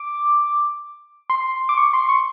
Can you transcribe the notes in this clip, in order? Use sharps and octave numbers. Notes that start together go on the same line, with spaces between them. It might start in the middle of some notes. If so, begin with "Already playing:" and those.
Already playing: D6
C6
D6
C#6
C6
C#6